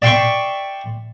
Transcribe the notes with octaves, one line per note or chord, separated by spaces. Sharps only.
D5 E5 G5 C6 C#6